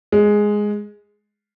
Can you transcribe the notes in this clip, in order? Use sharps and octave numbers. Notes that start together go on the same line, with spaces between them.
G#3